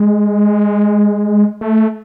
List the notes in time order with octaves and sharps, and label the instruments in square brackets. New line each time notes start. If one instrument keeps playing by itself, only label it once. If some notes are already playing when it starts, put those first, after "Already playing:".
Already playing: [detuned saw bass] G#3
A3